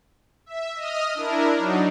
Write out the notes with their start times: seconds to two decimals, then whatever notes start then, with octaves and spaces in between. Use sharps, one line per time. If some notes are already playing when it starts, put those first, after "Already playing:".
0.46 E5
0.75 D#5 D#6 F6
1.14 D4 E4 A#4
1.57 F#3 D4 D#4